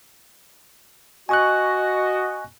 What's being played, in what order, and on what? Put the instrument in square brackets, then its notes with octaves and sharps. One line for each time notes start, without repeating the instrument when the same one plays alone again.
[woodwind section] F#4 D#5 [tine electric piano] G#5 C#6 F#6